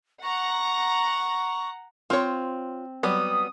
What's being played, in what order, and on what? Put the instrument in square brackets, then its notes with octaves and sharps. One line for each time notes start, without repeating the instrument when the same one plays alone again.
[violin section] F#5 A#5 [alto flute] C#6
[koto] C4 [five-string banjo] F4 C#5
[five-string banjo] F#3 G3 B3 [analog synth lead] D#6